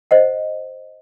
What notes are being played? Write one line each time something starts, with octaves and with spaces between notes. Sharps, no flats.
C5 D#5 F#5